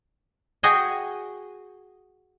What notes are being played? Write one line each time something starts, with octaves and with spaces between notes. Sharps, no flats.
F#4 G#4 D#5 G5 G#5